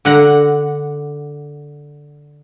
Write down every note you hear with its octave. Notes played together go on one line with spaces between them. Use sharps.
D3 F#5 A#5